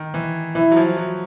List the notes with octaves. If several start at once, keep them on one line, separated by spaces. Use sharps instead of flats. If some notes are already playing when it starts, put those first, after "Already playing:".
Already playing: D#3
E3
E3 E4
F#3
F3
F#3